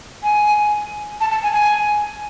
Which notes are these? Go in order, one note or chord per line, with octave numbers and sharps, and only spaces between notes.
G#5
A5
A5
G#5
G#5